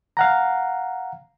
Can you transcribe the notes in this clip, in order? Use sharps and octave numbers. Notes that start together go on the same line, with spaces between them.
F5 F#5 A#5